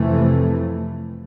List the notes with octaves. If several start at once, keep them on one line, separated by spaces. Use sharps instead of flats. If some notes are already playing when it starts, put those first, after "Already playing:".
Already playing: F2 C3 E3 A3